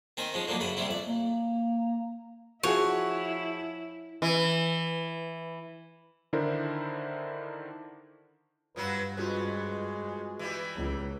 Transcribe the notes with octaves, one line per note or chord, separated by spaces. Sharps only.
D#3 C4 A#4 G#5
F3 G#3 C#4
D3 F3 F#3 A#3 D#4
F#2 C#3 B5 D#6
C3 G3 C4 E4
F2 D5
A#3
F3 E4 F#4 G#4 C#5
E3
D3 D#3 D4 E4 A#4 C5
G2 F3 F#3 F#4 B4
F2 G#3 C#4 F4 F#4 B4
E3 G3
C#2